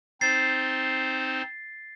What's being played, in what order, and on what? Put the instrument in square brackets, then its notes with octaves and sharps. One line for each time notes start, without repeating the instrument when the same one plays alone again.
[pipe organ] C4 D#4 C5 [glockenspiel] A6 C7